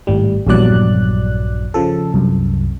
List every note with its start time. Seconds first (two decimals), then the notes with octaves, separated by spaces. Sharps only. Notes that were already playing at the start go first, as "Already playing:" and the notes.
0.07 G#1 A2 G3
0.47 A#1 E2 G2 F#3 D5 F#6
1.74 C#3 F3 A4
2.14 C2 F#2